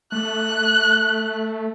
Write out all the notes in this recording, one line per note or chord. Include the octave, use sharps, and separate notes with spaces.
A3 F#6